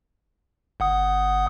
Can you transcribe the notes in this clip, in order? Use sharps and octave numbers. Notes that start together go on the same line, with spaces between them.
G1 F#5 D#6